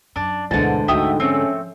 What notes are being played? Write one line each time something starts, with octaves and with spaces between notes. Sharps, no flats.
F#2 D4
D2 G#2 B2 D3 E3 A5
D2 A3 D#4 F#4 E5 G5 D#6
F3 A3 C4 C#4